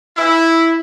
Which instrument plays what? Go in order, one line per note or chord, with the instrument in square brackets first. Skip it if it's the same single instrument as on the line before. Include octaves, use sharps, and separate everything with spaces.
[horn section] E4